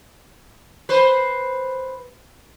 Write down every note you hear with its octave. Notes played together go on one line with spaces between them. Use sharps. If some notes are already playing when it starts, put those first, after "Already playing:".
B4 C5